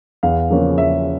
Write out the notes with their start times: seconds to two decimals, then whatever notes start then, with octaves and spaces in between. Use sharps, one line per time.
0.23 E2 F5
0.50 C#3 F3 A#3 C#4
0.78 E2 E5